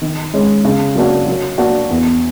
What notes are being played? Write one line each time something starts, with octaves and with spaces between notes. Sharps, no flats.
D#3
G#3 C#4
C#3
F#3 A#3 D4 F#4
F#3
A#3 D4 F#4
E2